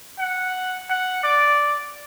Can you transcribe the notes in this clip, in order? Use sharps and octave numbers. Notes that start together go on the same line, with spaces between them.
F#5
F#5
D5